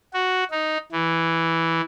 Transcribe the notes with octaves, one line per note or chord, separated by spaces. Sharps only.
F#4
D#4
E3